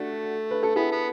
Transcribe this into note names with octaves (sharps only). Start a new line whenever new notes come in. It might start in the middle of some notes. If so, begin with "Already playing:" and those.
Already playing: A3 D4 F#4 A4
B4
A4
B3 E4 G#4
B3